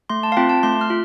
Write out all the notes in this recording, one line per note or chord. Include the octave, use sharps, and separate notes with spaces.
A3 C6
A5
F5
C4 F4 G5
A5
A3 C6
F6
F4